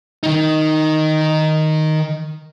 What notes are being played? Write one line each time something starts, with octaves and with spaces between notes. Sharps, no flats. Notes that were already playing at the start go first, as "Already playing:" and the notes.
D#3 D#4